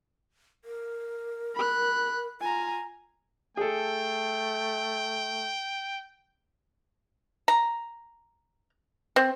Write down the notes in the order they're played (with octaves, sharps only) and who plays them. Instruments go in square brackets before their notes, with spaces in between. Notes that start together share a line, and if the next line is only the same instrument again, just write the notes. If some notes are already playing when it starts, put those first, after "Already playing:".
[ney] A#4
[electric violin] B5 F#6
[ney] F4 [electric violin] G#5 A#5
[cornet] A3 [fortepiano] G#4 A4 [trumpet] G5
[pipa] A#5
C4